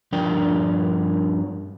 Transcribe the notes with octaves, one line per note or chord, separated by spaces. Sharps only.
G2 F3 D4 A#4 G5